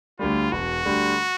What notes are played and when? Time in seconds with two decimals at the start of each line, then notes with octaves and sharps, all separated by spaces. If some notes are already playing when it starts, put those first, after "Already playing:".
0.19 D2 D3 G3 F4
0.52 E1 F#4
0.85 D2 D3 G3